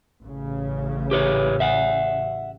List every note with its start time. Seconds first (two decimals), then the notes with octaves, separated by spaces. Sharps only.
0.23 A1 C#3
1.11 G4 B4 C#5
1.60 E5 F#5